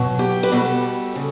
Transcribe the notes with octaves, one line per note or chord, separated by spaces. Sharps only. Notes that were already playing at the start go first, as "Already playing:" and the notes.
Already playing: B2 F#3
G4
B4
B2 G3 A4
C#3